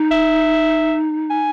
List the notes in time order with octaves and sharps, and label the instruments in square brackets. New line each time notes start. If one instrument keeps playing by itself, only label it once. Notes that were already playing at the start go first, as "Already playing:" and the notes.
Already playing: [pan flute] D#4
[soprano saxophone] E5
G#5